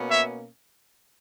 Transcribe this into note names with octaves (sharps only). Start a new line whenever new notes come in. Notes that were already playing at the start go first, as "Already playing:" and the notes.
Already playing: B2 A#3 C#4
C#5 E5